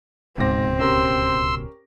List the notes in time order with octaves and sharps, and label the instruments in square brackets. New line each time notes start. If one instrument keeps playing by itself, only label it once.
[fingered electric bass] D1 C#2 B2 [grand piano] G#2 D6 A#6 [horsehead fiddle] C4
[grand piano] C#4 G4 A#4 [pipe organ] C6 E6